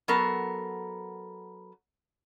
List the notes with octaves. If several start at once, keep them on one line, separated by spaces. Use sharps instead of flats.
F#3 B3 A4 A#4